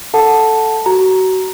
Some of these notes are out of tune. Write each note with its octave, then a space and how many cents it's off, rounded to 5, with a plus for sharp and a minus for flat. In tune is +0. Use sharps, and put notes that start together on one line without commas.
A4 +0 F#5 -10 A5 +0
F#4 +25 A#5 +0